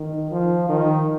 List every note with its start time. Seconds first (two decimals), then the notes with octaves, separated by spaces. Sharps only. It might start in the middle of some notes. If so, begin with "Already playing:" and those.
Already playing: D#3
0.31 F3
0.69 D#3